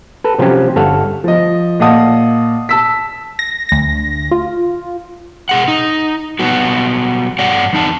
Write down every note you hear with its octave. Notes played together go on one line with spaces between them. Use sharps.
A4 B4
C3 F3 F#3 C#4 G4
G1 A4 C#5 F5 F#5
F3 D#5
A#2 D#5 F5 F#5 A5 D#6
A5 E6 B6
A#6
D2 A#6
F4
B2 G#4 F#5
D#4
B2 F#3 G3 B3 F#4
G2 C#5 D5 F#5
E2 D#4 A5